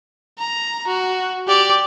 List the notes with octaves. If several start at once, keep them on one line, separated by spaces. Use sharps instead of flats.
A#5
F#4
G4 D5